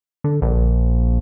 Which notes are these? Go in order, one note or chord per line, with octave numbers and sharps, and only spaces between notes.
D3
A#1